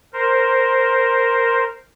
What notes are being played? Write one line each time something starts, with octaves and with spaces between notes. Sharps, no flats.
A#4 C5